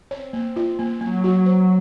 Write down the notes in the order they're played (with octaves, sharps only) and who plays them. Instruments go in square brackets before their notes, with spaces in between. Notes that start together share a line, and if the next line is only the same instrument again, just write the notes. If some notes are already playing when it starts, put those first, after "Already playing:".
[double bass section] C4 [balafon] C#5
[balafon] A#3
F4
A#3
[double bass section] F#3 [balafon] A#3
[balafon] F#4
C5